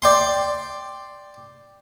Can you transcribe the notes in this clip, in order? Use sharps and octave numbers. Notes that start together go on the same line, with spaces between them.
D5 G5 C6